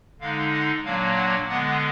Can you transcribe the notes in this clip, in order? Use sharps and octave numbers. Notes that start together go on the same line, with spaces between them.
D3 G#3 D#4 F5
F#5
A#2 F#3 A#3 D4 F5
F#5
D3 G#3 B3 F#5